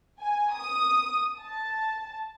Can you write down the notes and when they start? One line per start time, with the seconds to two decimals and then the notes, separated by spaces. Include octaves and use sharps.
0.20 G#5
0.53 D#6
1.38 A5